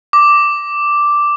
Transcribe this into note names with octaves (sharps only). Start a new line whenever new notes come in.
D6